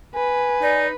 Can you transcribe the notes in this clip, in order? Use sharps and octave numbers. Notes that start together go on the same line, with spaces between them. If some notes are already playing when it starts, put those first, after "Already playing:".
B4 G#5
D#4 D5